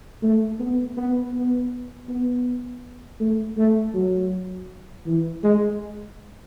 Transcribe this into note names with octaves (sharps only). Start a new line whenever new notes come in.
A3
B3
B3
B3
B3
A3
A3
F#3
E3
G#3